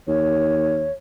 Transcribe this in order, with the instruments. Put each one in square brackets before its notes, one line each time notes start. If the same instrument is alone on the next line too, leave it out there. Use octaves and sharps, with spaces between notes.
[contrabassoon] D#2 [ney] C#5